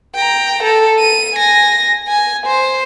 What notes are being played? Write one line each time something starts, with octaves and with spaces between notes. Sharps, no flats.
G5 A#5
A4
D#7
G#5 A#6
G#5
C5